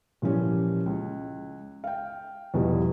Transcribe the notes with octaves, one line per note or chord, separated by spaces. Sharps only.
A#2 E3 F3 C#4 G4
C#2
F5 G5
E2 B2 F3 G3